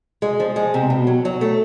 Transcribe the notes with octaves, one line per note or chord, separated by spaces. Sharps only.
G#3
F3
G#3
C3
B2
F#3
F#3
A3